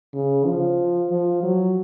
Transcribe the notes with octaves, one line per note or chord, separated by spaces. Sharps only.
C#3
F3
F3
F#3